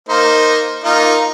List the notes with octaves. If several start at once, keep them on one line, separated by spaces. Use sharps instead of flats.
A#3 D#4 C5
A#3 D#4 F4